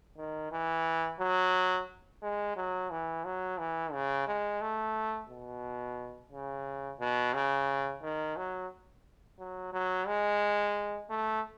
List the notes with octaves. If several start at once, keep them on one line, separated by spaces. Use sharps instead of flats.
D#3
E3
F#3
G#3
F#3
E3
F#3
E3
C#3
G#3
A3
B2
C#3
B2
C#3
D#3
F#3
F#3
F#3
G#3
A3